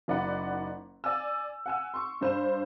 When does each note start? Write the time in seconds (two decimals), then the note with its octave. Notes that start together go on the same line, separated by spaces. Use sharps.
0.08 F#1 D#3 D5 D#5 F#5 B5
1.04 D5 G#5 E6
1.66 F#5 G#5 E6
1.94 C6 C#6
2.21 G2 D4 C5 F5 B5 E7